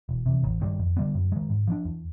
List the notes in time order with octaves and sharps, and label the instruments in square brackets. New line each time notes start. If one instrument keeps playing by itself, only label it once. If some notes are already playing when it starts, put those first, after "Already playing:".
[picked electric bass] E1
E2 C3
A1
G2 D#3 G3
F2
D3 G3 B3
F#2
D#3 G#3
G#2
F3 A#3 D4
E2